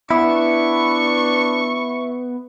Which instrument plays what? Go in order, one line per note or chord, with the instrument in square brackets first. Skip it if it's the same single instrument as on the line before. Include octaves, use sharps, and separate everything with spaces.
[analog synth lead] B3 [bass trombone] D4 [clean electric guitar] E4 [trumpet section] C#6